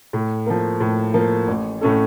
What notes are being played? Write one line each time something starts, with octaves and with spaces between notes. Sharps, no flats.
A2
F3 A#3
A2
F3 A#3
A1
A2 A3 C#4 A4